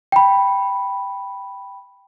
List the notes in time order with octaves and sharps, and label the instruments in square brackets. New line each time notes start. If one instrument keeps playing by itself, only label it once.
[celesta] G5 B5